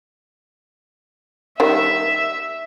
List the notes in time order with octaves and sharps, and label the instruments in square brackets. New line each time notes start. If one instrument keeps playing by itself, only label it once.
[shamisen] D#3 G3 [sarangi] E5